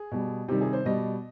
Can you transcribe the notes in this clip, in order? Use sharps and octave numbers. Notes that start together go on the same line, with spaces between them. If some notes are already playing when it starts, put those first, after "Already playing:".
Already playing: G#4
B2 G3
C3 D#3 G3 G4
G#4
C5
B2 G3 D#5